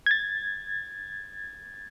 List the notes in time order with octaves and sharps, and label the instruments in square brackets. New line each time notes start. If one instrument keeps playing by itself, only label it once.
[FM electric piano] G#6 A6